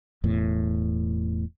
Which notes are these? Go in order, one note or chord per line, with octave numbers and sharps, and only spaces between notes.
E1 E2 A2